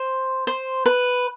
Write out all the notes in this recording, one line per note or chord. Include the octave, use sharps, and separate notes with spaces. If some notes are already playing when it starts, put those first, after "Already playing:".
Already playing: C5
C5
B4